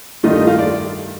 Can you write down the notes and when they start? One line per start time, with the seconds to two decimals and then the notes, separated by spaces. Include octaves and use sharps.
0.23 G2 D#3 A3 D4 D#4 F4 D#5
0.35 D#4 D#5
0.47 F4 F5
0.59 D5